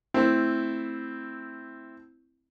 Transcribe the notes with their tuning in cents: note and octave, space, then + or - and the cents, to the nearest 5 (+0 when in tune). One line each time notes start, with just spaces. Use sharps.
A3 +0 C4 +0 E4 +0